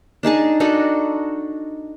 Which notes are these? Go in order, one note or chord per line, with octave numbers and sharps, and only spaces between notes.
D4 D#4 G#4 A5
D4 D#4 F#4 A4